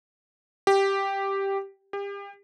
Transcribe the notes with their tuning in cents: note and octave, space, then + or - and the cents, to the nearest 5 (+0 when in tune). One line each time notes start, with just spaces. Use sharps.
G4 +0
G4 +35